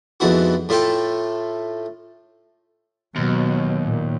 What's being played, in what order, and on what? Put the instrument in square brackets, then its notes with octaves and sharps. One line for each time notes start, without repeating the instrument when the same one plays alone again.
[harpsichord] F2 G#2 B3 E4 F#4
A2 A3 F4 A4 G5
[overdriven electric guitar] D#2 [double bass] B2 F#3
[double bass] A#2